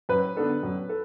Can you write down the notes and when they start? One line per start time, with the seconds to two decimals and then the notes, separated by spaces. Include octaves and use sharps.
0.09 F#2 B4
0.37 D3 B3 D4 A4
0.63 F#2
0.89 A4